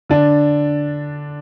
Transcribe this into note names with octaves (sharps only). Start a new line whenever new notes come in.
D3 D4